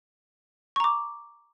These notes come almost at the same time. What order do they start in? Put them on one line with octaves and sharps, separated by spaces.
C#6 A#5 D6